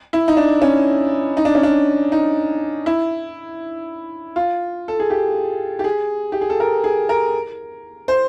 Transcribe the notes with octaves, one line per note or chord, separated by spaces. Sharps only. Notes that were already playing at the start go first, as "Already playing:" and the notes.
E4
D#4
D4
C#4
D#4
D4
C#4
D4
D#4
E4
F4
A4
G#4
G4
G4
G#4
G4
G#4
A4
A#4
G#4
A#4
C5